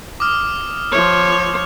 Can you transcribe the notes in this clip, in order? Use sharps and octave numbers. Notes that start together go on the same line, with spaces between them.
D6 D#6 F6
F3 C#5